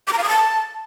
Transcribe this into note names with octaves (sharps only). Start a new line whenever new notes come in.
D6
A#5
F5
D#6
A5